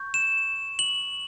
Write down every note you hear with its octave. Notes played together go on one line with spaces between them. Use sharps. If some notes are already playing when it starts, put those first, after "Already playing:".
Already playing: C#6 G6
E7
F#7